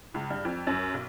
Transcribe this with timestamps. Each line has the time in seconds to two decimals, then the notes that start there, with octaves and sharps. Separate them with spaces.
0.14 C#2
0.30 G2
0.45 F2
0.67 F#2
0.94 B1